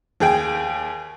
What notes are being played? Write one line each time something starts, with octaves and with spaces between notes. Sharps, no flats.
D#2 G#4 G5 G#5